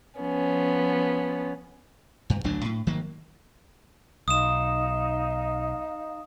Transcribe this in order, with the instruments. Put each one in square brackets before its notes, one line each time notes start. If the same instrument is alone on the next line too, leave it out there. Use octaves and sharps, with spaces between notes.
[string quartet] F3 B3 C#4
[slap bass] G2
F#1 D2 F#3 D4
A2
G#1 D#3 F#3 A#3
[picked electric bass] B1 [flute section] D#4 D#5 F5 [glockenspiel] D#6 E7